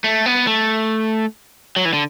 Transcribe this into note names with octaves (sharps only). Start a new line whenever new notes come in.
A3
B3
A3
F#3
E3
D3